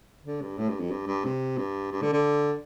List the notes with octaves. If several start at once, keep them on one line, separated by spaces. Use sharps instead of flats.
D3
G2
A2
G2
F2
G2
G2
C3
G2
G2
D3
D3